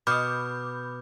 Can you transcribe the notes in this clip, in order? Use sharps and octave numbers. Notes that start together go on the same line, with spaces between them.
B2 B5 D6 D#6 F6 G6